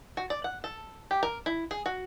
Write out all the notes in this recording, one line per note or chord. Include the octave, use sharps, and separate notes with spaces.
F#4
D5
F#5
A4
G4
A#4
E4
G#4
F#4